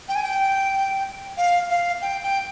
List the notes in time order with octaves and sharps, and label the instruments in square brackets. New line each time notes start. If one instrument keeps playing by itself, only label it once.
[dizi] G5
G#5
G5
F5
F5
G5
G5